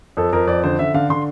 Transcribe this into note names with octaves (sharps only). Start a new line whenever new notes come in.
F2 A4
F2 A#4
F2 D5
D3 C5
D3 E5
D3 F5
D3 C6